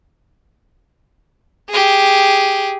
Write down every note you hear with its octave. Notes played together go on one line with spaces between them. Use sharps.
G4 G#4